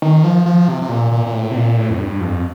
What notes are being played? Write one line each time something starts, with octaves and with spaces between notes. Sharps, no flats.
D#3
F3
F3
C3
C3
A#2
A#2
A#2
A2
C3
A#2
A2
F2
G2
F2